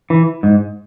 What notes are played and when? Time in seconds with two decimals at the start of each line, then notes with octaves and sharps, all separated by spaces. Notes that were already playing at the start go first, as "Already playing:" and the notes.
0.10 E3
0.43 G#2